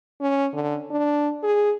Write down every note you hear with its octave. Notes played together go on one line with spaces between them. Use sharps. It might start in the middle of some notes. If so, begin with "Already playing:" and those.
C#4
D3
D4
G#4